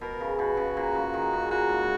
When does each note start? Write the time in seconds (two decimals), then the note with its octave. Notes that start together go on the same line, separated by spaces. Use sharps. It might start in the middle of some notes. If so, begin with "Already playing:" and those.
0.01 B2 A#4
0.21 C#3
0.39 B2 F#4
0.57 C#3
0.77 A#2
0.95 C#3
1.14 D#3
1.33 C#3
1.50 A#2 F#4
1.69 G#2